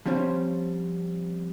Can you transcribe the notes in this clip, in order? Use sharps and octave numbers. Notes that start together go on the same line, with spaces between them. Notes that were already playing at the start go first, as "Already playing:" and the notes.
F3 G3 C4 C#4 C5